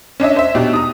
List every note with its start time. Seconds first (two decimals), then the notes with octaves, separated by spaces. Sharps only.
0.20 C#4 D4 D#5 E5
0.36 C5 E5
0.55 B2 D4 D#4 G4
0.73 A#5 D#6